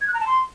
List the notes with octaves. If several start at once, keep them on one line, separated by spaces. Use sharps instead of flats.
G#6
F#6
A#5
A5
C6